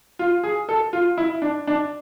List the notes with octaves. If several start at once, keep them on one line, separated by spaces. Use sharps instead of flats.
F4
G#4
A4
F4
E4
D4
D4